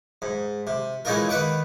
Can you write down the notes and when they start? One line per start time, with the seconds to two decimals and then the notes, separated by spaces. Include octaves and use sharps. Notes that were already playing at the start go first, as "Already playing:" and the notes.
0.22 G#2
0.67 C3
1.05 E3 G#3 C#4 D#4 F4 A#4
1.29 D#3 B4 F#5 D6